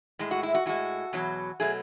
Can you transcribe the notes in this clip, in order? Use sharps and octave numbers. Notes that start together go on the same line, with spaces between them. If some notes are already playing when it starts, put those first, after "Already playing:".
A2 G#3
F#4
E4
F#4
A2 G#3 F#4
E2 B2 F#3
B2 F#3 A3 G#4